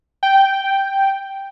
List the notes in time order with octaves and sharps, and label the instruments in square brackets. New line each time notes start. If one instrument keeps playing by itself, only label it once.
[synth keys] G5